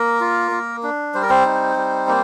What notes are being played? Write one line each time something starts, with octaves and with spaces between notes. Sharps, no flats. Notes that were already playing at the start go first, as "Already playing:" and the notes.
Already playing: A#3 A#4
F4
A#3
D4
G3 C5
A#4
C4 C5
D#4
G3
A#3